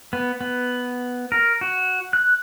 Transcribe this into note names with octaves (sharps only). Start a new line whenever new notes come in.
B3
B3
A#4
F#4
F#6